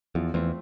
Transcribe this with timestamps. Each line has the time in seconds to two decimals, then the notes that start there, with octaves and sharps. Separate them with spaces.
0.15 E2 F3
0.34 E2 A3 C4